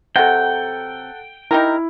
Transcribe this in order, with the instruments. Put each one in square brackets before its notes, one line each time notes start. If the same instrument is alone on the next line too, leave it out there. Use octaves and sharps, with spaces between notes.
[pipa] C3 F#3 [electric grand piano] A4 F#5 [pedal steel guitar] G5
[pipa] D#4 G4 A#4 [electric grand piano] E4